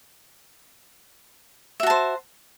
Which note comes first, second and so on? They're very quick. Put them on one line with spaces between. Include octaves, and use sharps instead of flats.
E5 F#4 A5 C5